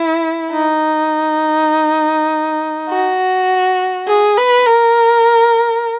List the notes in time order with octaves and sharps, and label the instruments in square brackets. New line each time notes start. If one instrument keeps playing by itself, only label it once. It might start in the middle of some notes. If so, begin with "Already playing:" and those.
Already playing: [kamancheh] E4
D#4
F#4
G#4
B4
A#4